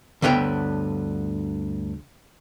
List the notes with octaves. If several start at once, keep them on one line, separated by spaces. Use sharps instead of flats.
D2 G2 D3 B3 C#5 G5